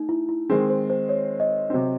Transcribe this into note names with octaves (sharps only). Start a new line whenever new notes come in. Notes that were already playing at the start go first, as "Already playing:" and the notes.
Already playing: A3 D#4
E4
E4
D#3 G#3 C4 G#4
C5
C5
C#5
D#5
C3 F#3 C4